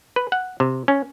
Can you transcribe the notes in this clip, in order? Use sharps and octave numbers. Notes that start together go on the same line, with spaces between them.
B4
F#5
C3
C#4